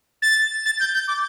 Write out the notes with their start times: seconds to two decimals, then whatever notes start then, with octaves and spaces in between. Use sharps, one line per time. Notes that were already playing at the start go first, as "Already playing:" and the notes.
0.22 A6
0.66 A6
0.80 G6
0.94 G6
1.08 D6